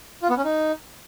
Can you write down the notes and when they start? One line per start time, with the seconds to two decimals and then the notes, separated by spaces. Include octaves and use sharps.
0.23 F4
0.30 B3
0.37 C#4
0.45 D#4